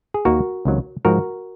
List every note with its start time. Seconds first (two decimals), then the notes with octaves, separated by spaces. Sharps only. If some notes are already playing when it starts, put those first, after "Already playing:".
0.14 G#4
0.25 D#2 D#3 A#3 F#4 A#4
0.65 C#2 C3 D#3 F#3
1.05 G#2 F3 G#3 F#4 A#4